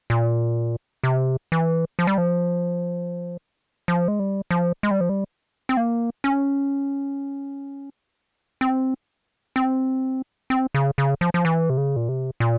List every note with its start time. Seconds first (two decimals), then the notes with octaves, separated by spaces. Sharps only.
0.10 A#2
1.04 C3
1.52 E3
1.99 F3
2.07 G3
2.18 F3
3.88 F3
4.08 G#3
4.20 G3
4.51 F3
4.83 G#3
4.91 G3
5.01 F3
5.09 G3
5.69 C4
5.77 A#3
6.24 C#4
8.61 C4
9.56 C4
10.50 C4
10.75 C#3
10.98 C#3
11.21 F3
11.34 F3
11.45 E3
11.70 C3
11.77 C#3
11.96 A#2
12.09 C3
12.40 A#2